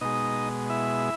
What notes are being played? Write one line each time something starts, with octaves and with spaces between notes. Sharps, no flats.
B2 G#3 D#4 D#5
E4 E5